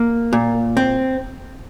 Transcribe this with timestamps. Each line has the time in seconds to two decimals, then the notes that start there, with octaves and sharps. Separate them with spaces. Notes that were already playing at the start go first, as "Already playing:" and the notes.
Already playing: A#3
0.33 A#2
0.77 C4